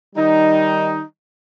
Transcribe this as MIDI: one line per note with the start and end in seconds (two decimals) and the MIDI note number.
0.16 1.03 51
0.16 1.03 55
0.16 1.03 63